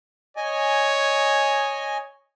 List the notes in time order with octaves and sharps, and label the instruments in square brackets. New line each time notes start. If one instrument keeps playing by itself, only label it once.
[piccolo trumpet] C#5 [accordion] D#5 G#5